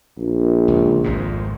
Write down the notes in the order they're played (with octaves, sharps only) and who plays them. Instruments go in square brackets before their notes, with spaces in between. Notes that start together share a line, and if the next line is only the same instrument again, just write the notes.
[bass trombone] A#1
[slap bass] C#2
G#1 F2 G#2